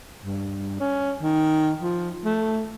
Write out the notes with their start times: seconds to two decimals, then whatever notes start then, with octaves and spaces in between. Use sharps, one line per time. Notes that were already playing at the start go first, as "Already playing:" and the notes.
0.25 G2
0.80 C#4
1.22 D#3
1.81 F3
2.25 A3